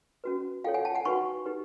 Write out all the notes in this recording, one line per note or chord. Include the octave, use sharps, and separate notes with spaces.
C#4 F#4 B4
F4 A4 C#5 F5 G5
F#5 G#5
G5 A5
F#5 G#5
D#4 F#4 B4 B5 C#6
D#4 G4 B4